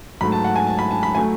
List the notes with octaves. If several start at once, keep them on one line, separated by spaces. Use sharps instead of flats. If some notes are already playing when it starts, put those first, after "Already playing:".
G#2 F#3 A3 B5
A5
F#5
G#5
A5
B5
A5
B5
F#3 A3 G#5